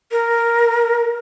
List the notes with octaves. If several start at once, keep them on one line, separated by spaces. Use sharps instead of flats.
A#4